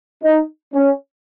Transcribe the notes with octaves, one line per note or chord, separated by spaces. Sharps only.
D#4
C#4